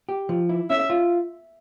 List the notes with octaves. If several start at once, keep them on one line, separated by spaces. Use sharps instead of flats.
G4
F3
E4
C#4 E5
F4